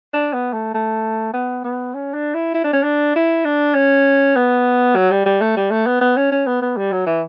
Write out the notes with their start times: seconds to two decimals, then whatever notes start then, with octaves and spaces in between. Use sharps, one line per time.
0.14 D4
0.33 B3
0.53 A3
0.74 A3
1.33 B3
1.64 B3
1.94 C#4
2.14 D4
2.34 E4
2.54 E4
2.64 D4
2.73 C#4
2.83 D4
3.15 E4
3.45 D4
3.75 C#4
4.36 B3
4.96 F#3
5.11 G3
5.26 G3
5.41 A3
5.57 G3
5.71 A3
5.86 B3
6.01 B3
6.17 C#4
6.32 C#4
6.47 B3
6.62 B3
6.77 G3
6.92 F#3
7.07 E3